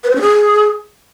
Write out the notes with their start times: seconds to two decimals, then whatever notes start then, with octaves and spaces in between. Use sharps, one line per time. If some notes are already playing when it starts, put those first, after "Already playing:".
0.04 B4
0.10 C5
0.15 C#4
0.21 G#4